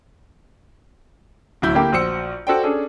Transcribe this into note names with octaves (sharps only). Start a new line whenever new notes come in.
D1 F#3 E4 G6
D3 A#3 E4 G4
A#1 F#4 C5 E6 C#7
F#4 A4 C5 D5 G5
C#4 D4 G#4 A4